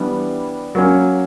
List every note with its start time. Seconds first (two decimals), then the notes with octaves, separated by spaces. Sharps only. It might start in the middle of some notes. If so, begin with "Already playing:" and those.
Already playing: E3 G3 B3 D4
0.75 F#3 A#3 C#4